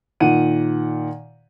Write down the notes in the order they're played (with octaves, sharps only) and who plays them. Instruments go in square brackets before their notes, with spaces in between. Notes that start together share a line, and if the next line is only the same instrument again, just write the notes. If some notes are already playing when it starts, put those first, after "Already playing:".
[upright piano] A#2 D#3 F#5 D#7